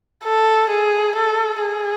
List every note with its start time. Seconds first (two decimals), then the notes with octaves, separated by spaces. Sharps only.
0.24 A4
0.70 G#4
1.16 A4
1.61 G#4